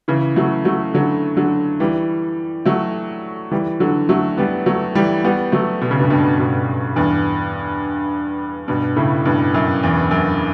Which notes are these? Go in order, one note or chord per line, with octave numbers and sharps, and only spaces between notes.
C#3 E3
F#3 A3
F#3 A3
D3 F#3
D3 F#3
E3 G3
F#3 A3
E3 G3
D3 F#3
F#3 A3
G3 B3
F#3 A3
E3 G3
G3 B3
F#3 A3
B2
C#3
G2 B2
G2 B2
G2 B2
E2 G2
G2 B2
A2 C#3
G2 B2
F#2
E2
F#2